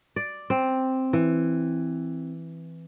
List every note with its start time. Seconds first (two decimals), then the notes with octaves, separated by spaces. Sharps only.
0.16 D5
0.50 C4
1.13 E3